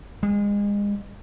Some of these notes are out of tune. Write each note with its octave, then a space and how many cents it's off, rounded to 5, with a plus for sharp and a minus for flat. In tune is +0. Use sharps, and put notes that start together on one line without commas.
G#3 -30